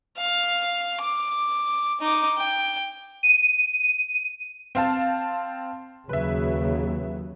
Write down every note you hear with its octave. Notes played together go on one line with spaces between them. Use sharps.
F5
D6
D#4 D6
G5
D#7
C4 F5 A5
D#2 C#3 F#3 B4 E5